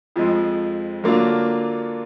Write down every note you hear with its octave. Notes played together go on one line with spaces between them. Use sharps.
F2 F3 G#3
D3 F#3 A#3 D4 F4